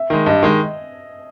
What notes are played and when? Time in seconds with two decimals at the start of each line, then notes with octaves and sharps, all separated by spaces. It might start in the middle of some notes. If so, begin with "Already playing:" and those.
Already playing: E5
0.10 D#3 G#3
0.26 G2 D#5
0.43 D#3 G#3